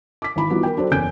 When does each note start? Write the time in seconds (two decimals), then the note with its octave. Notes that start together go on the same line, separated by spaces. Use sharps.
0.22 D6 B6
0.36 G#1 E3 B5
0.50 E3 F3 G3 B3 D#4 F#4
0.63 A#4 G5
0.77 F#3 D4 A4 C5
0.91 F#1 E2 C#4 G#5 G6 D7